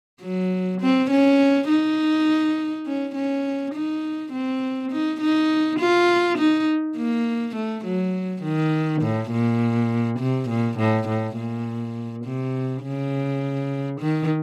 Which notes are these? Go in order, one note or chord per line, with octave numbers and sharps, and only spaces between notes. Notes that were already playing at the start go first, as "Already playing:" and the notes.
F#3
C4
C#4
D#4
C#4
C#4
D#4
C4
D#4
D#4
F4
D#4
A#3
A3
F#3
D#3
A2
A#2
C3
A#2
A2
A2
A#2
C3
C#3
D#3